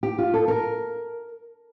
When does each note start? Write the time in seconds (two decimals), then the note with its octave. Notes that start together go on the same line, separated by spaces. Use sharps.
0.03 G4
0.18 F4
0.34 A4
0.48 A#4